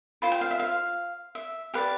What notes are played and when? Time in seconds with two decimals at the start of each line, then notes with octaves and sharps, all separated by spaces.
0.22 F4 C5 B5
0.32 G5
0.41 F5
0.51 E5
0.60 F5
1.35 E5
1.74 G4 B4 D5 F5